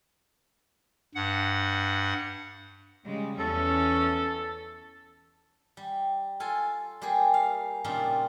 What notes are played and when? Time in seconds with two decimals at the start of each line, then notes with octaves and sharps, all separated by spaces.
1.15 G2 F#5
3.05 C#3 G3 G#3
3.39 E2 C#4 A4
5.77 G3
6.40 F4 A4 G#5
7.02 G3 A#3 G4 G#4
7.34 F5
7.84 A#2 C#3 G3 D4 D#4 F4